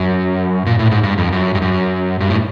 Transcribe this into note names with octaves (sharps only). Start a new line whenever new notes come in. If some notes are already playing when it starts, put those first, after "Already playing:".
Already playing: F#2
A#2
A2
G#2
G2
F2
F#2
G2
F#2
G2
A2